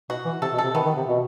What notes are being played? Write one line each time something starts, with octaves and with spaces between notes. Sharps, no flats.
B2 F#4
E3
C3 A4
B2
A4
C3
D#3 B3
D#3
C3
B2